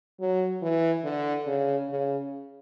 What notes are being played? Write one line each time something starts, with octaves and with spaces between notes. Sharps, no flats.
F#3
E3
D3
C#3
C#3